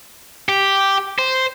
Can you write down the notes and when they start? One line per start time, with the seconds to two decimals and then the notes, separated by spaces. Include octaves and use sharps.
0.49 G4
1.19 C5